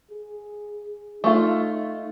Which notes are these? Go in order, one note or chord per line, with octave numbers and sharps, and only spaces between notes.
G#4
A3 D#4 F4